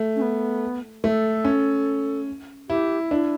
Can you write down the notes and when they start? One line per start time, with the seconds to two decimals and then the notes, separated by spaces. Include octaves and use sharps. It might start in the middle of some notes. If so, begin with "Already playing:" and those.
Already playing: A3
0.16 C#4
0.22 B3
1.04 A3 A4
1.45 C#4
2.69 E4 G4
3.10 D4 E4